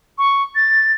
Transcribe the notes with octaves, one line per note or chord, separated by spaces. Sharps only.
C#6
A6